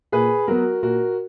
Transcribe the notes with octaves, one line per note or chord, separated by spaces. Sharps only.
A#2 G#4 B4
F#3 B3 F#4 A#4
A#2 F#4 A#4